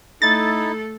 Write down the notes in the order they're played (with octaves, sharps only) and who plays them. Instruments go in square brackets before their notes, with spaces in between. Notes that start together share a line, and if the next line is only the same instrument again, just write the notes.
[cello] A3 A4 [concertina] D#4 E4 [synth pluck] A6